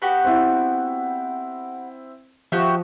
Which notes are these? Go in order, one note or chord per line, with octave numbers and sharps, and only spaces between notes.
B3 F#4 G4
C4 E4
F3 F#4 G4 E5